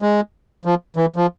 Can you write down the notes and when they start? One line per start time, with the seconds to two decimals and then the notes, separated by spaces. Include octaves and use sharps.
0.02 G#3
0.65 F3
0.96 E3
1.16 F3